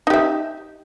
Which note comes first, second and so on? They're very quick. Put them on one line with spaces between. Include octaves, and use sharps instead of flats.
D#4 G4 E5